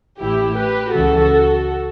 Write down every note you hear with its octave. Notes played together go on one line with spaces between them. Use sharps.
A1 A2 E3 E4 G4
G4 B4
C#2 C#3 E3 F#4 A4